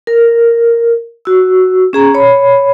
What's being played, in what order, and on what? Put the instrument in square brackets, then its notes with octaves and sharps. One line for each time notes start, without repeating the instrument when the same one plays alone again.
[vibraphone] A#4
F#4 E6
C#4 G#4 A#5
C#5 B5